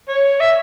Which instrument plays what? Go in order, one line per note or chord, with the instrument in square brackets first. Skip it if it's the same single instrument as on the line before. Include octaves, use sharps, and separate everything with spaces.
[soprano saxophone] C#5
E5